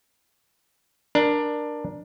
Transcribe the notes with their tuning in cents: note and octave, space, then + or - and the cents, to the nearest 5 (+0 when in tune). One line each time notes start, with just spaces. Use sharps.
D4 +10 A#4 +15